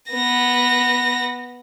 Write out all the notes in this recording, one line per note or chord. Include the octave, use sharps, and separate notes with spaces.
B3 A#6